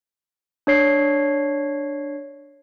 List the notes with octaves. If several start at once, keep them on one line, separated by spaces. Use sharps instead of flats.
D4 C#5 C7